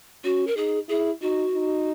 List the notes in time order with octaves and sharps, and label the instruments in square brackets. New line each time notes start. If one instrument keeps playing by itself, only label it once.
[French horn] C#4 [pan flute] F#4
[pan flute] A#4
[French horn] D#4 [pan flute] G#4
[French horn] E4 [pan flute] G#4
[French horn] D#4 [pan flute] F#4
[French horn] D#4